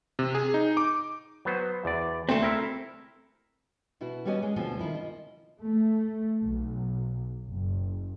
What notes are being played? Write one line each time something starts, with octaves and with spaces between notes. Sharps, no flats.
C3
G#4
D#4
D6
F#3 B3 C5
E2 D5
D2 A3 C4
E4 A#4 E5
B2 E4 F#4
G3 B3 C#4 F#4 C5 D#5
G#3
D2 B2 F3 C4 G#5
D#3 E3 E4 F4
D#5
A3
B1
F#1